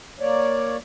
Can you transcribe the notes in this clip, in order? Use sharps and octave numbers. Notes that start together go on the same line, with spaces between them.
A#3 C#5 D5